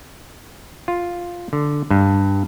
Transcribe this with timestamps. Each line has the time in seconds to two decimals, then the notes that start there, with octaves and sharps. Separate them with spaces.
0.88 F4
1.53 D3
1.91 G2